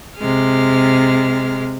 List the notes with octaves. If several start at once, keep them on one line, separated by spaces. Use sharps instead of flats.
C3 G#3 F6